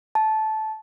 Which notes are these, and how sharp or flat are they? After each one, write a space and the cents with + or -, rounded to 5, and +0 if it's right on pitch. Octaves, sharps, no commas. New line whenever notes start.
A5 -15